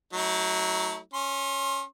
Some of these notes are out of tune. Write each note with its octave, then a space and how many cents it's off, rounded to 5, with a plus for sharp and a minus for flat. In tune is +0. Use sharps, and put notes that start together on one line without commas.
F#3 +10 A3 +0 E4 -45
C#4 +0 C6 +35